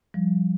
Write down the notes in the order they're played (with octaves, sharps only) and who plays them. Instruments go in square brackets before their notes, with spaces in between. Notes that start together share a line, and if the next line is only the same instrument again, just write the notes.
[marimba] F3 G3